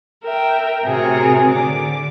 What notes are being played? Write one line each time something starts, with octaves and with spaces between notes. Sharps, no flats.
A#4 E5 G5
A2 C3 C4 F#4 G#4 A#4
D3 D6